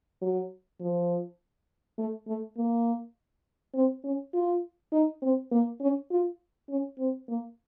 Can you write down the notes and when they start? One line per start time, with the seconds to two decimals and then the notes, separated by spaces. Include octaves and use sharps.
0.21 F#3
0.80 F3
1.98 A3
2.28 A3
2.57 A#3
3.74 C4
4.04 C#4
4.34 F4
4.92 D#4
5.22 C4
5.52 A#3
5.80 C#4
6.10 F4
6.69 C#4
6.98 C4
7.28 A#3